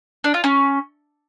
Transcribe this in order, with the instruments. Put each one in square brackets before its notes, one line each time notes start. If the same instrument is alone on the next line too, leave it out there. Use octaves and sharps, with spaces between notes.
[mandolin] D4
F4
C#4